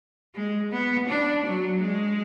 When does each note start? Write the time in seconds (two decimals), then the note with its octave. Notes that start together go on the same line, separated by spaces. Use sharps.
0.35 G#3
0.71 B3
1.08 D4
1.45 F#3
1.81 G#3